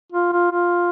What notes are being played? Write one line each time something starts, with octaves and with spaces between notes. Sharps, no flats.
F4
F4
F4